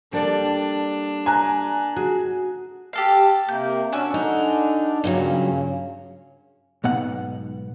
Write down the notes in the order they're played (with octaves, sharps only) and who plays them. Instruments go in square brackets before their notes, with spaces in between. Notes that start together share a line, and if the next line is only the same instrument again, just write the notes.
[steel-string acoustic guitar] G3 D5 G5 [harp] A#3 A4 [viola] D4
[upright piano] G#5 A#5 F#6
[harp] F#4 [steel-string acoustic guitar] G#4
[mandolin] G4 A4 F5
[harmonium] C3 A#3 [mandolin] G6
[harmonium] C#4 D4 [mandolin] F#4 G#5 E6
[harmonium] D3 D4 [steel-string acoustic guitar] D#4
[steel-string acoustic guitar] G2 A#2 F#3 [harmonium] C#3
[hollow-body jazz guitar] B1 G#2 B3 F#5